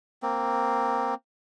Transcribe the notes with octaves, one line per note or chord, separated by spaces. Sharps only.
A#3 C4